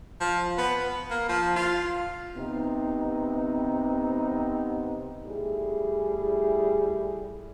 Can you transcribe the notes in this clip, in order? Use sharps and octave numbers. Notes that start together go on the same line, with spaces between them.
F3
B3
B3
A#3
F3
F4
C3 B3 C4 D#4
G3 A3 E4 G#4